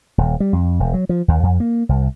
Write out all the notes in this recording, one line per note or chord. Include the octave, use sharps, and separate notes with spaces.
D#1
G3
F2
E1
F#3
F3
D#2
F2
A#3
C2